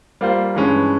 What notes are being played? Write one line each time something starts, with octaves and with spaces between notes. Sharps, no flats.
G3 A#3 F4 C5
G2 E3 G#3 C#4